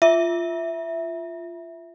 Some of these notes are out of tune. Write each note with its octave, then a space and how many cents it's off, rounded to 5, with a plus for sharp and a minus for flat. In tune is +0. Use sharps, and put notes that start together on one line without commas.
F4 -15 E5 +0